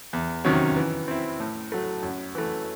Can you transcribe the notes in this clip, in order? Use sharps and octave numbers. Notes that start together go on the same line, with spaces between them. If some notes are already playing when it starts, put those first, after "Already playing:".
E2
C3 D#3 F#3 C#4
E3
C4 E4
A2
F#3 A3
F#2
E3 A3